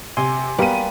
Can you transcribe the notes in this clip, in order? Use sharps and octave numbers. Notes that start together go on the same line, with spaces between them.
C3 G#5 C6
G3 A#3 B3 D#7